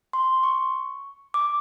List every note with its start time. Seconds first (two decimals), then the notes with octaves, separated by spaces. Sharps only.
0.13 C6
0.43 C#6
1.34 D6